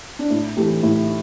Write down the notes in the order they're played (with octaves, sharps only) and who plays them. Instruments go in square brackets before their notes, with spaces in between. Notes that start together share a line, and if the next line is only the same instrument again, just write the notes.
[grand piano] D4
[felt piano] A2 [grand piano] E4
[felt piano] E3 A3 [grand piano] G4
[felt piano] A2 [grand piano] E4